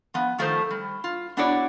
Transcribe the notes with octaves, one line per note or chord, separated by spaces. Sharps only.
F3 B3
D#3 F3 A3 D#4 A4 C5
G3
F4
B3 D4 E4 F#4 C#5 D5